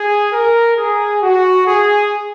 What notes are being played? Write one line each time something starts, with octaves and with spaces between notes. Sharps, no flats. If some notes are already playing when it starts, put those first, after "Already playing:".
Already playing: G#4
A#4
G#4
F#4
G#4